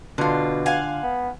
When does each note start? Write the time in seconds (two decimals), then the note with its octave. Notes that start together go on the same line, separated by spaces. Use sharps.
0.18 B2 D3 F4
0.66 F5 F#5 G#5
1.03 B3